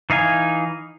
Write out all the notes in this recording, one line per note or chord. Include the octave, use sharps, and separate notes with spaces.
E3 D#4 F5 G#5